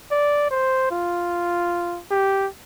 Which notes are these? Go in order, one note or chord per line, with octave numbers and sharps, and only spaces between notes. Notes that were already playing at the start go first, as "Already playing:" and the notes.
D5
C5
F4
G4